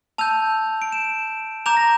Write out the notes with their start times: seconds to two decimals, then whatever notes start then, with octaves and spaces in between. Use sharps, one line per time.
0.18 A5 E6 G6 F7
0.82 D7
0.92 E7
1.66 A#5 D6 G6 F7
1.77 A#6